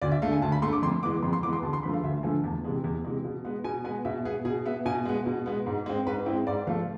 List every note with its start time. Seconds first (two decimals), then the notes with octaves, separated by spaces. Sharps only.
0.02 D2 D5
0.11 E5
0.22 D3 A3 F5
0.32 G#5
0.42 D2 A5
0.52 B5
0.62 D3 A3 C6
0.73 D6
0.82 F2 C6
1.03 E3 G#3 B3 D6
1.23 F2 C6
1.33 C6
1.43 E3 G#3 B3 D6
1.53 C6
1.63 D2 A5
1.73 C6
1.83 D3 F3 A3 B5
1.94 F5
2.03 D2 E5
2.23 D3 F3 A3 G#5
2.44 E2 A5
2.64 C3 E3 G#3
2.84 E2
3.05 C3 E3 G#3
3.25 B2
3.45 G#3 B3
3.64 B2 G#5
3.84 G#3 B3 G#5
4.05 B2 E5
4.25 B3 G#4
4.45 B2 G#4
4.66 B3 E5
4.85 B2 G#5
5.05 G#3 B3
5.26 B2
5.46 G#3 B3
5.66 G#2
5.86 G#3 C4
6.06 G#2 B4
6.26 G#3 C4 E4
6.47 G#2 D5
6.67 F3 A3 F5